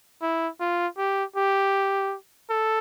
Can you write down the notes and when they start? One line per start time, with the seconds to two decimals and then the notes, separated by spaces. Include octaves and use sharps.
0.22 E4
0.60 F4
0.98 G4
1.36 G4
2.50 A4